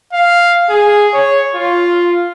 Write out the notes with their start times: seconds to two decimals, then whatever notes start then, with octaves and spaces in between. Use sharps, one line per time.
0.13 F5
0.70 G#4
1.14 C#5
1.55 F4